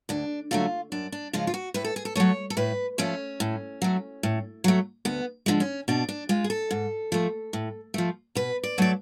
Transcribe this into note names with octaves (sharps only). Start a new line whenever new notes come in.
D2 D4
D3 F#3 A3 F4
F#2 D4
D4
C#3 F3 G#3 F4
F4
F#4
A2 B4
A4
G#4
A4
F#3 A3 C#5
A4
A2 B4
F3 A3 C#4
A2
F#3 A3
A2
F#3 A3
D2 B3
D3 F3 G#3
C#4
B2 D4
D4
G#3 F4
G#4
A4
G#2
F3 A3
A2
F3 A3
B2 B4
D5
F#3 A3 D5